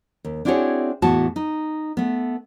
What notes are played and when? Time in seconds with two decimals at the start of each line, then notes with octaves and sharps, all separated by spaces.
0.25 D#2
0.45 C4 D4 E4 F#4 G#4 C#5
1.02 E2 A2 E3 B3 F#4 A5
1.36 D#4
1.97 A3 B3